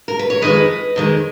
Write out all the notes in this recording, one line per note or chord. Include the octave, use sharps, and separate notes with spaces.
A#4
B4
C#5
F2 D#3 G#3 B4 D#5
F2 D#3 G#3